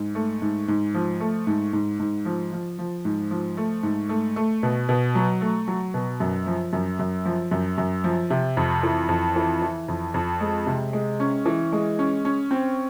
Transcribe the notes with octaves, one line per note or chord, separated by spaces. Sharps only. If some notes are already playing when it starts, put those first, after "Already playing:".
Already playing: G#2
A3
G#2
G#2
F3
A3
G#2
G#2
G#2
F3
F3
F3
G#2
F3
A3
G#2
A3
A3
B2
B2
F#3
A3
F#3
B2
F#2
F3
F#2
F#2
F3
F#2
F#2
F3
C3
F2
E3
F2
E3
E3
F2
F2
G#3
C3
G#3
C#4
E3
G#3
C#4
C#4
C4